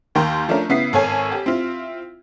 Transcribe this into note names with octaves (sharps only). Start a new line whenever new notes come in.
D#2 D#3 A#4 G5 C6 G6
F3 A3 C#4 D4 A#4
C#3 B3 E4 B6 C7
G#1 A4 C#5 G#5
G4
C4 E4 F4